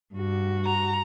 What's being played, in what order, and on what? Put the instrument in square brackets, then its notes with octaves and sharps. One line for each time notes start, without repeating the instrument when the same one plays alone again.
[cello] G2 F#4
[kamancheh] A#5